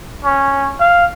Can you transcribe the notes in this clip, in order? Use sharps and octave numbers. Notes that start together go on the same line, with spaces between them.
C#4
F5